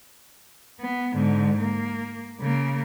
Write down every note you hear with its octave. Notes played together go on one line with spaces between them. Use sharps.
B3
G#2 D3
A#3
C#3 A#3